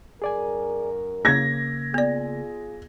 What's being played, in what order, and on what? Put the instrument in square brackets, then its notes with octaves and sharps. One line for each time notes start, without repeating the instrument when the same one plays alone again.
[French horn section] F#2 A#4 [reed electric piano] G#4 D5 G#5
[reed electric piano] C#3 A#3 [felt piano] G#6 A#6
[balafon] B3 D5 [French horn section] F4 G#4